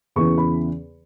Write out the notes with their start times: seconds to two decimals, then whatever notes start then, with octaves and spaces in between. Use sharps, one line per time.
0.16 E2 C#3 E3 C#6
0.38 B5